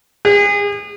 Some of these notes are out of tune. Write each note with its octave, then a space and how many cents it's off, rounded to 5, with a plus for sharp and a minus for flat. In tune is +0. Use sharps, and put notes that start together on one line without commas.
G#4 -35